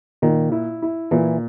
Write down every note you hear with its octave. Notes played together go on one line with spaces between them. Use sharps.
A#2 D#3
E4
E4
A#2 E3